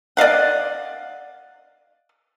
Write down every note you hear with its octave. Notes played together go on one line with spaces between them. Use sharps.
D5 D#5 F5 F#5